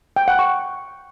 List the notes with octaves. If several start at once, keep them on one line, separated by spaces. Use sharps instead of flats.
G5
F#5
C#6